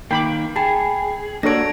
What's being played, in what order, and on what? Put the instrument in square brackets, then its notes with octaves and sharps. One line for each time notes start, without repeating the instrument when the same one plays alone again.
[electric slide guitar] D#3 A#3 [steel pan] G5 B5 D6
[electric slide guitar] G#4 [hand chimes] G5 B5 [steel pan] A5
[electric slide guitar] A#3 F#4 [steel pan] D4 A4 C#5 [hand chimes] A#6 D7